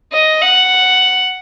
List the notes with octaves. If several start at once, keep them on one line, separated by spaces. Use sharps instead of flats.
D#5
F#5